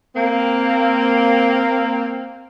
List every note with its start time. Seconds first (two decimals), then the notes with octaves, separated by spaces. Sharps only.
0.16 A#3 C4